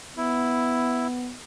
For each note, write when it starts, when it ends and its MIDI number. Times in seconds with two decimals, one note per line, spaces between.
0.17 1.35 59
0.17 1.07 64